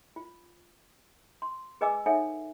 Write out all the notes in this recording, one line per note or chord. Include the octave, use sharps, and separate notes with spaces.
F4
C6
G#4 B4 D#5 G#5 D6 E6
D#4 A4 C#5 E5 F#5 G#5